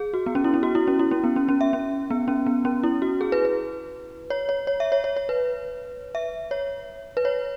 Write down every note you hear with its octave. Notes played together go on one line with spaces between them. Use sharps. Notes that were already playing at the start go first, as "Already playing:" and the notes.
Already playing: G#4
F#4
B3
C#4
E4
C#4
F#4
E4
C#4
E4
C#4
B3
C#4
C#4
E5
C#4
B3
C#4
B3
C#4
E4
F#4
G#4
B4
B4
C#5
C#5
C#5
E5
C#5
C#5
C#5
B4
E5
C#5
B4
C#5